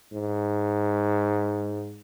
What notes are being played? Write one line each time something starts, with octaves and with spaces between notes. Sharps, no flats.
G#2